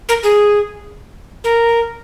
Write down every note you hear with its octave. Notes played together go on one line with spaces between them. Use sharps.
A#4
G#4
A#4